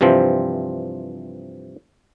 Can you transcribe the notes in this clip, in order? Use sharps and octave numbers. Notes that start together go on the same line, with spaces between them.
G2 C3 E3 F3 C4